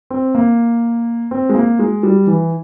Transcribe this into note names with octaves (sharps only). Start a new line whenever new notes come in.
C4
A#3
C4
G#3
A#3
G#3
G3
E3